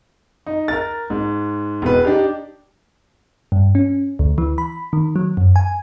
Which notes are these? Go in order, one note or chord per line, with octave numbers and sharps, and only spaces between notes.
D#4
A#4 A6
G#2
E1 B2 B4
D4 D#4 G4
G2
C#4
D2
E3
B5
D#3
F#3
F#2
G#5